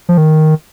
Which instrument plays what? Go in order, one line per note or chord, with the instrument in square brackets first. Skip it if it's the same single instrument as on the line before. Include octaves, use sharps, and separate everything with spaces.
[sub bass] F3
D#3